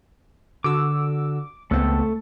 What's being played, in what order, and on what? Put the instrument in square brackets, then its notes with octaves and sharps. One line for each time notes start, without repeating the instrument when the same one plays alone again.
[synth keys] D3 F#4 E6 [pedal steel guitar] D6
[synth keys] C#2 B3 C4 [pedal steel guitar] A3 A4